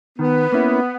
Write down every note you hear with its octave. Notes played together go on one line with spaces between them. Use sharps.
D#3 B3
A#3 C#4 E4